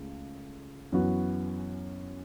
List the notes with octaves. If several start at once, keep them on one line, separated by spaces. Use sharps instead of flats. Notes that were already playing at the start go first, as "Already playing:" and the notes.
Already playing: C#2 C#3 A3
F#2 E3 B3 F#4